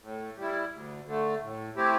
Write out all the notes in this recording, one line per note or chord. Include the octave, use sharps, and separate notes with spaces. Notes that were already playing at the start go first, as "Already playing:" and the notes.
A2
G3
E4
D2
D3 A3
A2
A3 C4 E4 G4